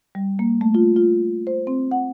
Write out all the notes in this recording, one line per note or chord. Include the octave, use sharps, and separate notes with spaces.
G3
A#3
A3
F4
F4
C5
C4
F#5